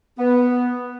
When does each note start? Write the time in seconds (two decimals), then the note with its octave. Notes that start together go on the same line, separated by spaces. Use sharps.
0.19 B3